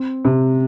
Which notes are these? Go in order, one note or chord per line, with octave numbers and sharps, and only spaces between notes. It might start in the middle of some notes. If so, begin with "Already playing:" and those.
Already playing: C4
C3